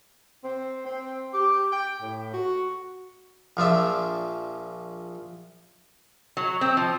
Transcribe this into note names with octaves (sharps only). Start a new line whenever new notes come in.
C4
C4
G4
G5
A2
F#4
A#1 F3 D4 E5
F#3
C4
F3